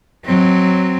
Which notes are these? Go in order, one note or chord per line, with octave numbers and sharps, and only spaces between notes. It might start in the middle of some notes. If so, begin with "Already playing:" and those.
F#3 C4